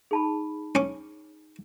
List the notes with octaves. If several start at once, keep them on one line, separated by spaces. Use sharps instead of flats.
D#4 G#4 A5 B5
C#4 D6